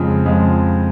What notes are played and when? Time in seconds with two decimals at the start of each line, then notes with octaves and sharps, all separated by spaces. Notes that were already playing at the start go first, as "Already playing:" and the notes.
Already playing: F2 C#3 F3 G#3
0.26 F2 C#3 F3 G#3